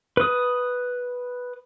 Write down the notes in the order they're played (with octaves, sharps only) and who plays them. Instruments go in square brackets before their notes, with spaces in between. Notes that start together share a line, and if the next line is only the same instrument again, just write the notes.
[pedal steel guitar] B4 D#6